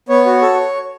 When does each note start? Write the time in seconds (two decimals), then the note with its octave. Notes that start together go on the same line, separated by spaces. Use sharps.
0.09 B3 C#5
0.26 F#4
0.42 A4